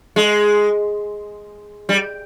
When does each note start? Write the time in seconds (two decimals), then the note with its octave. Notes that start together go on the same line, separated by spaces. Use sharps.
0.16 G#3
1.89 G3